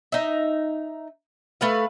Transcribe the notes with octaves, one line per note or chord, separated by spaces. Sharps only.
D#4 E5
A3 B4 F5